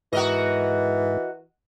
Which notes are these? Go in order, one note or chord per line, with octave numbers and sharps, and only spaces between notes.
G#2 E3 F#4 A#4 D#5